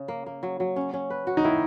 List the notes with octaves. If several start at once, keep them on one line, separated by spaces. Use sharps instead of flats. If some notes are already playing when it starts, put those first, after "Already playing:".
Already playing: C#3
A#3
A#3
F#3
F#3
C#4
C#4
B4
F#4
D#4
D#3 E4